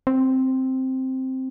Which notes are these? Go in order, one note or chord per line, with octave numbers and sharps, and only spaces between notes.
C4